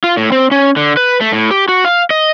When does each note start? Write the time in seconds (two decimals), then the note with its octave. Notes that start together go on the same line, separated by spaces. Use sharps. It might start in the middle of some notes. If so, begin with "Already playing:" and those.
0.04 F4
0.17 A2
0.32 C4
0.51 C#4
0.76 D3
0.97 B4
1.21 A3
1.33 A2
1.51 G4
1.69 F#4
1.85 F5
2.10 D#5